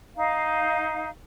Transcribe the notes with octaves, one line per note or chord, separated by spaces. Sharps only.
D#4 F5